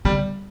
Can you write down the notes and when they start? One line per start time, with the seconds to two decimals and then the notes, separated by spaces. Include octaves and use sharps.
0.05 D3 G3